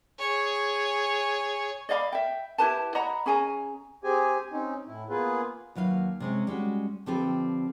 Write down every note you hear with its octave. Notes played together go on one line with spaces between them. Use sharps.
G#4 C#5
D5 D#5 F5 B5
E5 G5
E4 G4 B4 A5
D#5 F#5 A#5 B5
C#4 G#4 G#5 A#5
C4 G4 G#4 G#5
C4 C#4 D#4
A2 E4
A#3 B3 F4 G#4 B4
D#2 F#3 B4 F5
C3 G#3 C#4
G3 G#3 C#4 F#4
D3 F3 C4 G4 A4 B4